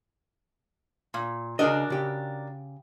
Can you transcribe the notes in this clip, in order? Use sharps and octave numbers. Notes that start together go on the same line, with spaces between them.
A#2
C#3 D4 F#4 G#4 A#4 D#5
C#3 G4